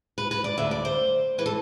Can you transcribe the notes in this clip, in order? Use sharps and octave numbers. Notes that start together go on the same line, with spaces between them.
B4
B4
D5
D2 D3 E5
D5
C5
E3 B4
A4